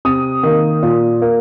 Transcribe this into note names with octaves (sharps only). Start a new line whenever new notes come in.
C3 D#6
D#3 A#3
A#2
A#3